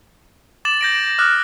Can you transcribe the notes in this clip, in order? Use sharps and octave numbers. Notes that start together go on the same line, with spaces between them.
D6 A6 E7 F#7
G6 A#6 D7
D6 D#6 F6 F#6